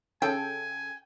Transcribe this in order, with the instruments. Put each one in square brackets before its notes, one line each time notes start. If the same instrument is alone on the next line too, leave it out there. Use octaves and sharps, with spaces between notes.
[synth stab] C#3 A4 [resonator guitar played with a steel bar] G5 [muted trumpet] G#5